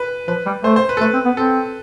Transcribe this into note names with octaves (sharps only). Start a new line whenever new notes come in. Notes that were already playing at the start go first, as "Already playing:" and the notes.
Already playing: B4
F3 B4
G3
A3 C5
C5
B4
A4
A3 B4
C4
B3
C4 A4